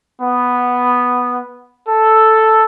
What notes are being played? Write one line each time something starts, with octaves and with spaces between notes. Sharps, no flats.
B3
A4